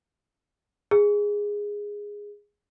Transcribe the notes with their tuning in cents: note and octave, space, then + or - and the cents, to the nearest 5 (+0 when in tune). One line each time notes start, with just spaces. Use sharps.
G#4 -10